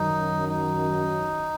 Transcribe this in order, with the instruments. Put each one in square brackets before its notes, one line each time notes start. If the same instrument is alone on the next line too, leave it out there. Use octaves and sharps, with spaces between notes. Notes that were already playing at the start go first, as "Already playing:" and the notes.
Already playing: [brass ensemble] F#2 D#3 F#3 [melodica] D#4
[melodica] D#4